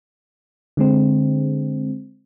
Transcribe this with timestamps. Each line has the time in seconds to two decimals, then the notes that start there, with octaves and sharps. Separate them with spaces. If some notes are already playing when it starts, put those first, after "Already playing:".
0.77 D3 G#3 C4